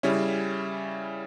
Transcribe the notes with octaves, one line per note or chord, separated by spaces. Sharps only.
C#3 G3 C#4 E4